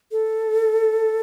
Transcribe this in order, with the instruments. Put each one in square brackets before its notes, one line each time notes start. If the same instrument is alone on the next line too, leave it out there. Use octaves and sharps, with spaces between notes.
[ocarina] A4